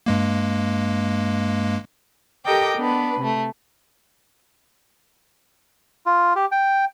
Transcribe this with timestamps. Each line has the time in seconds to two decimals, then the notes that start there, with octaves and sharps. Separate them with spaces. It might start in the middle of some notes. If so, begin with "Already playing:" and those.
0.06 G2 G#3 A#3
2.46 G4 A4 A#4 D#5 G5 D6
2.77 B3 D4 B4
3.19 C3 A3
6.06 F4
6.36 G4
6.52 G5